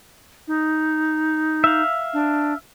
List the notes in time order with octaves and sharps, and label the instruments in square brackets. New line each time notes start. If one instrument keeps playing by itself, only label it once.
[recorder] D#4
[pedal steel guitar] E5 F5
[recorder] D4